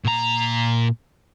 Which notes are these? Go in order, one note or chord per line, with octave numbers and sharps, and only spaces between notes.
A#2 A#5